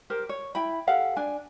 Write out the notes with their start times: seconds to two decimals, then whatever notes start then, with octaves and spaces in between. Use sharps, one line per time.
0.10 G4 A#4 C5
0.29 C#5
0.55 E4 G5 B5
0.87 G4 A4 F5 F#5
1.16 D4 G#5